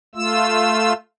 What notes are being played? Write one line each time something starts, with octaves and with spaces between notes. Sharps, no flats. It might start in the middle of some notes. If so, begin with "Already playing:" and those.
A3 F4 E6